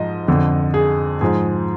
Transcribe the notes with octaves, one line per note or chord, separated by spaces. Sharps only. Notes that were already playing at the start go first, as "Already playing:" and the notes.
Already playing: G#2 F3 D#5
F2 D3 F3
G#4
G#2 F3 G#4